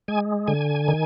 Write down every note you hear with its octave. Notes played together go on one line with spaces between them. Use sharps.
G#3 G#5
D3 G#5
D#3